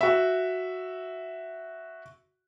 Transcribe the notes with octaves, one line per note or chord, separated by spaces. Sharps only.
F#4 E5